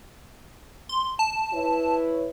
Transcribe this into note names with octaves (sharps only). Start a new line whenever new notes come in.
C6
A5
E4 B4 C#5